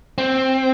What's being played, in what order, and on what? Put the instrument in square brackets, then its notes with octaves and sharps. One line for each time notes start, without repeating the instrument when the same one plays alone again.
[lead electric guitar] C4